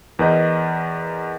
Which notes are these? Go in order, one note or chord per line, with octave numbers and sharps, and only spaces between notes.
E2 A#4 B4 D#5 G6